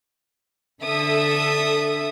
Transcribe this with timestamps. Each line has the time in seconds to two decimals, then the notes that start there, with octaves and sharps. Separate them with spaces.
0.82 D3 A4 E5 D#6